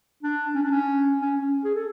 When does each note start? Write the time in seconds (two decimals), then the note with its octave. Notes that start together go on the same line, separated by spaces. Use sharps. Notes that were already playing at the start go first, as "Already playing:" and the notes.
0.23 D4
0.54 C#4
0.63 D4
0.71 C#4
1.21 C#4
1.37 C#4
1.64 G#4
1.75 A4